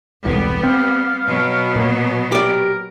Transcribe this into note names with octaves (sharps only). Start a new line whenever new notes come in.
E1 C2 A2 G3 B3
C4 F5
B2 F#3 B3
A#2 A#3
G4 A#4 D5